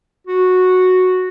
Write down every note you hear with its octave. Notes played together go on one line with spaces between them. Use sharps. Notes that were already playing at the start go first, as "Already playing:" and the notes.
F#4